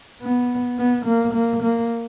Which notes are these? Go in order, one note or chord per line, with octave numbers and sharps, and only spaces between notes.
B3
B3
A#3
A#3
A#3